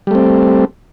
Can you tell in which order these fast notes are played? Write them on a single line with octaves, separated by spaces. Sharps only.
G3 A3 C4